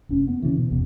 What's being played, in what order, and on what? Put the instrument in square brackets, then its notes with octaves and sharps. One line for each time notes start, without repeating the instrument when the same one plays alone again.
[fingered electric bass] F1 C#4
B3
C#3 E3
B2
F#1 E2 B2